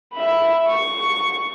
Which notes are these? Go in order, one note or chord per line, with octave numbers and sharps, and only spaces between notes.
E5 B5
C#6